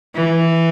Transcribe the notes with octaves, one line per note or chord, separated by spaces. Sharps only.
E3